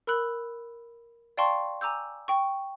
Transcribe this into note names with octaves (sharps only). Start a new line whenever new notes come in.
A#4 B5 E6 F#6 F#7
D5 F5 G5 A5 C6 C#6
G#5 A#5 D6 E6 G6
G5 C#6